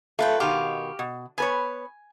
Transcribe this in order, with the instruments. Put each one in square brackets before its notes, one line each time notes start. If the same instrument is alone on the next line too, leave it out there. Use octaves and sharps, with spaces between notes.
[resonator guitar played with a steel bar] A3 [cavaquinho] F4 B4 G5
[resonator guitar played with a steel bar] B2 D#3 [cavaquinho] G4 F5 C6
[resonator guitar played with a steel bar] B2
[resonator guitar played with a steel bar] B3 B4 C#5 [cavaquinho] G#5